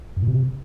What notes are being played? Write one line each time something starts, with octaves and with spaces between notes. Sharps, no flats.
F#2
A#2
C3